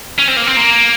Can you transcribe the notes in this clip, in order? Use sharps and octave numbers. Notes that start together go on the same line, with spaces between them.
C#4
C4
A#3
C4
A#3